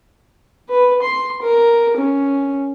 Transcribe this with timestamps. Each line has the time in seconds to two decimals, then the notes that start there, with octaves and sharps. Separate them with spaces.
0.69 B4
1.02 C6
1.42 A#4
1.97 C#4